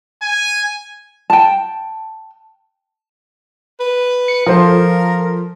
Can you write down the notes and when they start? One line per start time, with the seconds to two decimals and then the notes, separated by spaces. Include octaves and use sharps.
0.22 G#5
1.30 G5 A5
3.80 B4
4.28 C#7
4.46 F3 F4 A4 A#4 C5